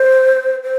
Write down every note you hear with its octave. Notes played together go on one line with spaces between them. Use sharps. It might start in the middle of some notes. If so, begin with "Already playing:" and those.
Already playing: C5
C5